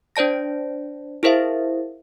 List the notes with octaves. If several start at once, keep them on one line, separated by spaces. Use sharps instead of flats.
D4 C5 D5 A5 A#6
E4 G#4 A#4 C5 E5 F5